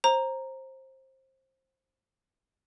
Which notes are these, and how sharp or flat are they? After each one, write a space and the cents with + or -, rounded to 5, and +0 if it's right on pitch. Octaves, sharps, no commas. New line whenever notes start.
C5 +20 A#5 +0